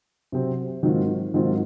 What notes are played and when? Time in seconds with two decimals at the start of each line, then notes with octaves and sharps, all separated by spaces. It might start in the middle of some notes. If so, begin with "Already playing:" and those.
0.32 C3 F#3 C4
0.83 G#2 D#3 F#3 C4 F4
1.34 G#2 D#3 F#3 C4 F4